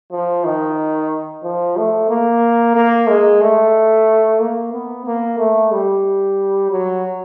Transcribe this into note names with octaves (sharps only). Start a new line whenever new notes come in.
F3
D#3
F3
A3
A#3
A#3
G#3
A3
A#3
B3
A#3
A3
G3
F#3